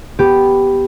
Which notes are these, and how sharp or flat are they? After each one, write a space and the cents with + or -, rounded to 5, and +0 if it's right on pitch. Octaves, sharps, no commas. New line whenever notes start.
B3 +0 G4 +0